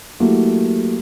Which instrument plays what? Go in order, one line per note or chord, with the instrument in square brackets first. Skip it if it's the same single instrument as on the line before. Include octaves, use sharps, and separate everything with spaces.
[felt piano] F#3 A3 A#3 E4 G4